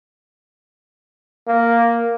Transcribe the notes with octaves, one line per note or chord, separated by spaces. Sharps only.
A#3